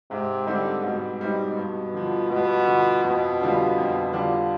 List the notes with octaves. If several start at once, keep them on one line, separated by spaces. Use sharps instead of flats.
G#2 C3
D3 G3 C4 D#4
G#2 B2
G3 C4 D#4
G2
D3 F3
G2 B2
D3 F3
F2 B2
D3 G3 D4 F4
F2
D3 G3 D4 F4